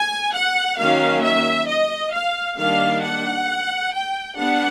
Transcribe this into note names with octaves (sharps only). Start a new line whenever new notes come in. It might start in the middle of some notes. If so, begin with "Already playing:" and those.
Already playing: G#5
F#5
D#3 F#3 A#3 C#4 F5
E5
D#5
F5
D#3 G3 A#3 D4 F5
F#5
G5
G3 B3 D4 F#5